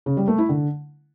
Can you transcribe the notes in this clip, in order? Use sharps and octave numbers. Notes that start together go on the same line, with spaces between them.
C#3
G3
A3
E4
D3